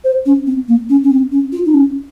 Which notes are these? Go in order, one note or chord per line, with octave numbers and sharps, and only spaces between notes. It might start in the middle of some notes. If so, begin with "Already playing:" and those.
C5
C#4
C4
A#3
C#4
C#4
C4
C#4
F4
D#4
C#4